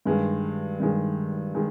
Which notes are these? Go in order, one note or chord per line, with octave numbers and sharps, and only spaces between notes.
G2 D#3 G#3
G2 D#3 G#3
D#3 G#3